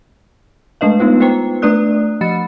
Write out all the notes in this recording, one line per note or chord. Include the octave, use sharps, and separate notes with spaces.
G#3 A3 D4 B4 D#5 F5
B3 D#4 F4 B4
F4 B4 C5 G5 A#5
A3 D4 B4 D5 D#6 F#6
F3 D#5 B5 A6 C#7